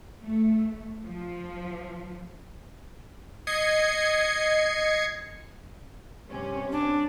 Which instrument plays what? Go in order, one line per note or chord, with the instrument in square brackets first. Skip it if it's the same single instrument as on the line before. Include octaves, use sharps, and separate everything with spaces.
[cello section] A3
F3
[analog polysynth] D#5 G#6 C7 C#7
[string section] G2 C3 C#4
[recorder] D4